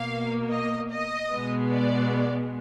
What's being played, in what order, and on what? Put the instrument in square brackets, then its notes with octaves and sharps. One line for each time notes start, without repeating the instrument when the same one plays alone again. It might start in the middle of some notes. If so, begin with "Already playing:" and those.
Already playing: [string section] B2 A#3 F5
D#5
D#5
B2 G#3 B3
D5